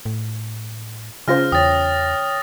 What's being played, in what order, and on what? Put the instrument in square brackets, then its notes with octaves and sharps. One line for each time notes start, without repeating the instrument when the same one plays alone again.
[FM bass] A2
[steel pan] C#3 F4 C5 [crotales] F6 A#6
[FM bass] E2 [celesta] C#5 G5 [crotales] D#6 A6